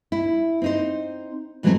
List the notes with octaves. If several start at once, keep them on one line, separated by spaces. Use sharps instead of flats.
E4
C4 D#4 C5
G#2 E3 F#3 G#3 A3 C4